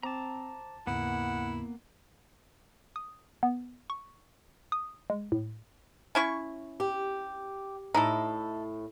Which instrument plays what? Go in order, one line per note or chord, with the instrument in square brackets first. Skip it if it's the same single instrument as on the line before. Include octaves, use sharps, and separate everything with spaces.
[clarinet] C4 [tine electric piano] C5 D6 [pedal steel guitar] A5 A#5
[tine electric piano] D#2 G#2 C#3 [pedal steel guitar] A#3 B3 [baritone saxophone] E4 [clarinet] F#5
[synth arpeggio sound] D#6
B3
C#6
D#6
G#3
A2
[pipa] C#4 E4 C#6
[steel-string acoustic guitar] G4
[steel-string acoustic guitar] A2 [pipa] D#4 E4 A4